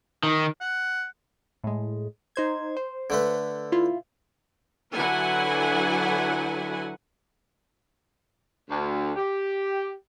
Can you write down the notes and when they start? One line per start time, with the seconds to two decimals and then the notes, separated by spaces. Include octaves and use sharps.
0.23 D#3
0.61 F#5
1.64 A2 G#3
2.36 D#4 C5 G#6
2.77 C5
3.10 D3 A3 B4
3.72 E4 F4
4.93 D3 F#3 E4 B4 F#5 G#5
8.69 D2
9.16 G4